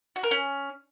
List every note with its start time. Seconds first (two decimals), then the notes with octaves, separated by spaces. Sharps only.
0.16 F#4
0.23 A#4
0.31 C#4